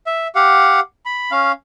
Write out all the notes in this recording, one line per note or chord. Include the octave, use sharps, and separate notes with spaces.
E5
G4 F5 F#5
B5
C#4 F5